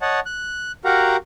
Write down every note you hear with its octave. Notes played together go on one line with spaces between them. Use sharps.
C#5 D#5 F#5 A5
F#6
F#4 G4 A#4 F5 F#5 A#5